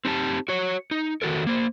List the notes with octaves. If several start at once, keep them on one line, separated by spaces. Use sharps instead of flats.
C4 D#4 G4 A5
F#4 C#5
D#4
D#3 F#4 A4 A#4
A#3 C5